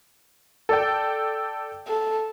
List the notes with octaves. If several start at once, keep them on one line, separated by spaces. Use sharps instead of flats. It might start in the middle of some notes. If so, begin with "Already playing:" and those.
A4 D5 G5
A4